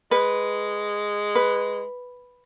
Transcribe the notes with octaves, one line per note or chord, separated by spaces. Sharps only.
G#3 B4
B4